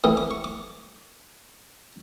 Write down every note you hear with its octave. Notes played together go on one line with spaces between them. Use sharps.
E3 A3 C4 D#6
D6
C#6
D6